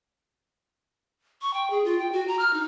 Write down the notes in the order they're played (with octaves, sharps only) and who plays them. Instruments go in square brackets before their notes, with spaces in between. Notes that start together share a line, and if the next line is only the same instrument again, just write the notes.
[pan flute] C#6
G5
G#4
F4
G5
F#4
A#5
F6
D#4